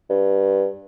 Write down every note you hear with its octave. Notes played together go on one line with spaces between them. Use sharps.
G2